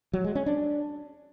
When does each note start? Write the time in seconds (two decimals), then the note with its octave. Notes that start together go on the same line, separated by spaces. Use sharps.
0.13 F#3
0.24 G#3
0.35 C#4
0.46 D4